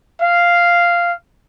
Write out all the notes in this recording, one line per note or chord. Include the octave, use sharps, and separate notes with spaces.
F5